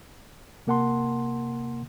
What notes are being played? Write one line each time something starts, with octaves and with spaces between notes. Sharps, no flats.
C3 A#3 A#4 F#5 A5 C6